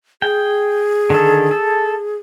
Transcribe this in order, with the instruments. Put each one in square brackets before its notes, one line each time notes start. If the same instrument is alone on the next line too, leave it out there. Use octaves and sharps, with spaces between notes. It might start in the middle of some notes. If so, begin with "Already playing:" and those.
[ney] G#4 [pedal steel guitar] G5
[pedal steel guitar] D3 D#3 A4
A4